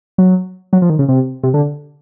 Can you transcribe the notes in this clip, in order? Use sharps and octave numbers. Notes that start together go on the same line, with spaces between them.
F#3
F#3
F3
D#3
C#3
C3
C3
D3